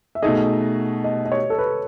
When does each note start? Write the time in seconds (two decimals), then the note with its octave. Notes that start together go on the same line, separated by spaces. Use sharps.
0.15 E5
0.22 B2 A3 D#4 G#4 D#5
1.04 D#5
1.26 D#5
1.32 C#5
1.50 A4
1.58 B4